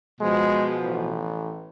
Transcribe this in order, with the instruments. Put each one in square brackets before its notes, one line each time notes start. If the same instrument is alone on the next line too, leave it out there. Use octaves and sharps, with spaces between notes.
[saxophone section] B2 F3 [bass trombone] G#3
[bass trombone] A1